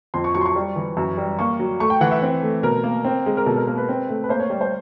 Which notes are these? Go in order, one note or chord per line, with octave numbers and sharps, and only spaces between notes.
F2 C6
C#6
F#3 C#6
C6
C#6
G3
E3
F#2
G3
A#3 C#6
F#3
A3 C#6
G5
E3 F#5
E5
C4
A3
B2 A#4
A#3
C4
G#3
A#4
B2 A4
A#4
A#3 A#4
B4
C4
A3
B4
A#3 C5
C#5
G3 C#5
C5